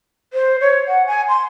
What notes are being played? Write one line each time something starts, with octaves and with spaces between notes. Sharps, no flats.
C5
C#5
F#5
G#5
C6